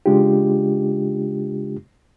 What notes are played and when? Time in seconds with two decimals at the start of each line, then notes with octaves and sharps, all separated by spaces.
0.06 C#3 G#3 D4 F4 G4